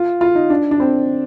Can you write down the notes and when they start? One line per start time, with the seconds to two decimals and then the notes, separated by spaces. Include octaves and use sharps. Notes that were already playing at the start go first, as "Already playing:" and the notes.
Already playing: F4
0.21 F4
0.35 D#4
0.50 D4
0.71 D4
0.80 C4